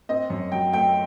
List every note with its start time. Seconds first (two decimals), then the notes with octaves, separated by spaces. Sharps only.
0.09 C4 D#5
0.30 F#2
0.52 F#3 G5
0.73 A3 G5